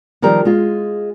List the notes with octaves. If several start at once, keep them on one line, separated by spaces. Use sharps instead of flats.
D#3 F3 G3 A#4
G#3 F4